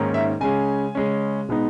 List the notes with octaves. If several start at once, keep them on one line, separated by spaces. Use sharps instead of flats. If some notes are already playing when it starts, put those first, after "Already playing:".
Already playing: G#2 D#3 A#3 C#4
E5
C#3 G#3 C#4 G#5
C#3 G#3 C#4
B2 G#3 B3 D#4